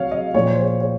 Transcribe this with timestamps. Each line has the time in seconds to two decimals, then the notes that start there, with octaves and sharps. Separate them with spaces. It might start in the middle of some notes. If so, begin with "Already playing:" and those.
Already playing: C3 F#3 F#4 C#5 F5
0.11 D#5
0.34 A#2 F3 C#5
0.48 C5
0.62 C#5
0.81 C#5